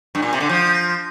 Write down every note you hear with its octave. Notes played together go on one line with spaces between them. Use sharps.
G2
A#2
C3
D3
F3 G6
A#6